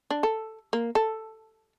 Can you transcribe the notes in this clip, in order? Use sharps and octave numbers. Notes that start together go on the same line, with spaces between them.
D4
A4
A#3
A4